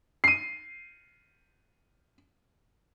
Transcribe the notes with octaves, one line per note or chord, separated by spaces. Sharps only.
C7 D#7